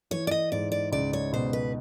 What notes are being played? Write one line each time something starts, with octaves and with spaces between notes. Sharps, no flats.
E3 C#5
D5
D#5
G#2 D5
D5
C#2 D5
C#5
B2 C5
B4